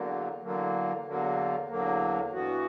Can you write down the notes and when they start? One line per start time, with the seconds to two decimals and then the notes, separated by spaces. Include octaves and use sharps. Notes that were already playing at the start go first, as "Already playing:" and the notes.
Already playing: E2 D3 F#3 A#3
0.41 E2 D3 F#3 A#3
1.05 E2 D3 F#3 A#3
1.69 E2 D3 F#3 A#3
2.32 G2 E3 B3 F#4